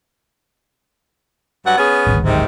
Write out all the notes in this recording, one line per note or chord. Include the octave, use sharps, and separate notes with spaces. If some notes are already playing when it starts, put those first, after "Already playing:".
G2 F#3 F#5
B3 C#4 G#4
D1 G#1
G#2 C3 D#3